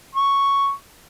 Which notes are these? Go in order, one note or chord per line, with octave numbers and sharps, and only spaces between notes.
C#6